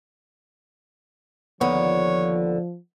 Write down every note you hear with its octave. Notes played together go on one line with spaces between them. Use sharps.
D#2 D3 F3 B3 C#5